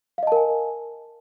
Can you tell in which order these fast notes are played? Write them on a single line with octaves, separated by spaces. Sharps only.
F5 D#5 A5 A#4 G#5